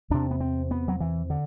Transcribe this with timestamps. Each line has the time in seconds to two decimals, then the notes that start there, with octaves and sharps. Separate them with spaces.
0.10 E2 C3 D4
0.31 B3
0.40 C4
0.71 B3
0.88 F#3
1.00 E3
1.30 D3